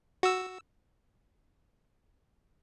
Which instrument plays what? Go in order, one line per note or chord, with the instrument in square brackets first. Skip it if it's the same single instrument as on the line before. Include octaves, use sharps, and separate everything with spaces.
[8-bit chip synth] F#4 E6